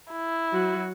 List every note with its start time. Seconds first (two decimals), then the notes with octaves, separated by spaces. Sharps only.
0.12 E4
0.52 F#3 F#4